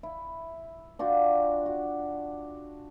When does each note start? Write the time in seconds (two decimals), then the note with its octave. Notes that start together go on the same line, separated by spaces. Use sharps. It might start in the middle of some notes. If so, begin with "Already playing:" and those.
0.03 E4
0.99 D4 F4 F#4 G5
1.66 F#4